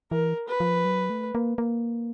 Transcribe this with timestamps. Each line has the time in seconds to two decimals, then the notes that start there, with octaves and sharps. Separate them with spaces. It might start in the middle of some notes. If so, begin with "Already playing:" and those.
0.11 E3 A#4
0.48 B4
0.60 F3
0.85 F#3
1.10 A3
1.35 A#3
1.58 A#3